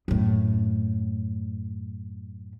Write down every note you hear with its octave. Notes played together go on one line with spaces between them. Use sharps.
F#2 A2